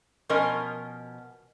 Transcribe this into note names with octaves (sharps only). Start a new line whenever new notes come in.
B2 F3 C#4 A#4 D#5